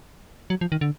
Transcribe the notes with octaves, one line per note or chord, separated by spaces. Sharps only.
F#3
F3
D#3
D3